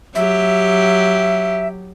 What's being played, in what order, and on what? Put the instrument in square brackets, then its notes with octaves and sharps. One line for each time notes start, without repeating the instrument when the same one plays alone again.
[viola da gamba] F#3 G4 [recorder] E5